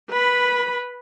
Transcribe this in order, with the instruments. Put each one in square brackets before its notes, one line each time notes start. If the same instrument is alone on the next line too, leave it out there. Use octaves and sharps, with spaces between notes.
[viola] B4 B5